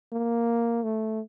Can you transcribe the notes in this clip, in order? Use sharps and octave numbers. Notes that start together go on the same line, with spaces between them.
A#3
A3